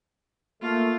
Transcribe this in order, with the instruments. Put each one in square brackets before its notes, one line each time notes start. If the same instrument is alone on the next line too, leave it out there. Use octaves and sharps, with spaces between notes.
[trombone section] A3 [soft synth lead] A#3 [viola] F4